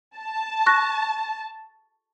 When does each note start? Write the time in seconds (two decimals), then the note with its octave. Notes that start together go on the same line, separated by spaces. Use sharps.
0.16 A5
0.66 C#6 F#6 A#6